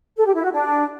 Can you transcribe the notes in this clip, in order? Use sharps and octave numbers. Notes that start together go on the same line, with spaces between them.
A4
G4
E4
F#4
D4